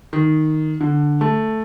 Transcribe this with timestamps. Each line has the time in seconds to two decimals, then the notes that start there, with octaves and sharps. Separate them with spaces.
0.13 D#3
0.80 D3
1.21 A3